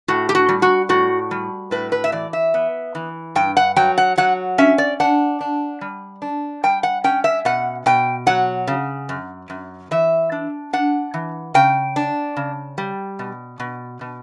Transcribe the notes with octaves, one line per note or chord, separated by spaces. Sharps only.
A2 F#4
G4
F#4
G3
F#4
A2 F#4
G3
A2 B4
B4
E5
E3 D5
E5
B3
E3
G2 G5
F#5
F#3 G5
F#5
F#3 F#5
C#4 E5
D5
D4 F#5
D4
G3
D4
G3 G5
F#5
C#4 G5
E5
B2 F#5
B2 G5
F#3 F#5
C#3
F#2
F#2
E3 E5
D4
D4 F#5
E3
C#3 G5
D4
C#3
G3
B2
B2
B2